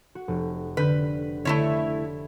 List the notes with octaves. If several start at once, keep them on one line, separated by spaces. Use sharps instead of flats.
F#4
F1
D3 B4 G6
D3 A3 E4 C#5